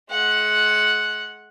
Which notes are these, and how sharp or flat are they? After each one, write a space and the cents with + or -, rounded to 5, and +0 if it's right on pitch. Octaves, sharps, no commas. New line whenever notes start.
G#3 +35 F#5 +0